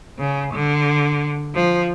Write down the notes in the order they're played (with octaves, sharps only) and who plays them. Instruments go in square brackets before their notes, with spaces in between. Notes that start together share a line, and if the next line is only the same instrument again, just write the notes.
[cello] C#3
D3
F3